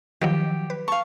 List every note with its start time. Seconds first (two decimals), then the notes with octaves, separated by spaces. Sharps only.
0.21 D#3 F3 F#3 G4
0.70 B4
0.88 F5 A5 C#6